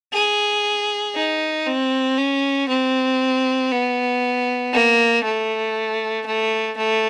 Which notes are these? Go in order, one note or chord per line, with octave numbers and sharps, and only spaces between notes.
G#4
D#4
C4
C#4
C4
B3
A#3
A3
A3
A3